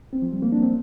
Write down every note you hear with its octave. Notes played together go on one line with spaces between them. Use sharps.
C4
F3
G3
A#3
D4
C4